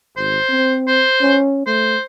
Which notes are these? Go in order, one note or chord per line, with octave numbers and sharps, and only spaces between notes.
G#1 C5
C4
C5
C#4
A3 C5